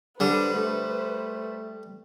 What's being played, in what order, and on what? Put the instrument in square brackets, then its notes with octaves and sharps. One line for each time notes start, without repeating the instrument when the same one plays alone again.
[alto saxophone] D3 [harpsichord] G3 [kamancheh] B4 C5
[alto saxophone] A3